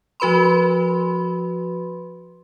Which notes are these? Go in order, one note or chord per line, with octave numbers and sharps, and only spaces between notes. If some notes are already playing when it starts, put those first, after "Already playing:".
F3 F#4 B4 B5 C6